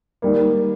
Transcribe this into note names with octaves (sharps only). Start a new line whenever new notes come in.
D#3 G3 A#3